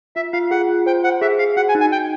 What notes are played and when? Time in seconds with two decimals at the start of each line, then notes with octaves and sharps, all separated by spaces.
0.16 F4 E5
0.33 F4 F5
0.51 G#4 F#5
0.69 F4
0.86 C5 G5
1.04 C5 F#5
1.21 G#4 E5
1.39 G#4 F5
1.56 F#4 F#5
1.69 G#5
1.75 D#4
1.81 G#5
1.92 D#4 G5